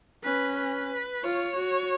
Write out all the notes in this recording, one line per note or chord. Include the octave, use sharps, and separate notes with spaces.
C#4 B4
B4
F4 C#5
F#4